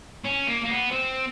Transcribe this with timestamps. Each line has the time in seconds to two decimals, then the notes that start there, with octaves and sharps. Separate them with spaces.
0.24 C#4
0.47 A#3
0.64 A#3
0.69 B3
0.91 C4